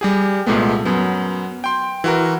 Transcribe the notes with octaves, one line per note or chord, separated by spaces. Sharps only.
G3 G4 G#4
C2 A#2 G#3 A3 B3
F#2 F#3 B3
G5 C6
E3 F#4 A#4